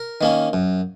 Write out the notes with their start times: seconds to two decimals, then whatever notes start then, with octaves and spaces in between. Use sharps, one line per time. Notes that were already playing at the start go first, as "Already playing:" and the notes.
Already playing: A#4
0.21 D#3 A#3 C#4
0.53 F#2